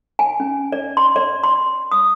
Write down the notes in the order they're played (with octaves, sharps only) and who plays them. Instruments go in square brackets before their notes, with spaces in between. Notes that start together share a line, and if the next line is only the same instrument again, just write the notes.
[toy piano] G#5
C#4
D5
C6
D5
C6
D#6